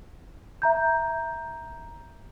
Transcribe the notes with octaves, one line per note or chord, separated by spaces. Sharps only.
E5 A#5 G6